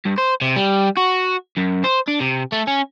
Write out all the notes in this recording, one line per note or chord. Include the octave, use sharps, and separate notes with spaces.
G2
C5
C3
G3
F#4
F#2
C5
D4
C3
A3
C#4